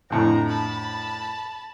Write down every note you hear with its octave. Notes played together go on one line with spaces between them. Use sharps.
F2 A2 D3 A#5
A5 B5